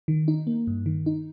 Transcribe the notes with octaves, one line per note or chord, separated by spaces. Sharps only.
D#3
D#4
A#3
G2
D#3
D#4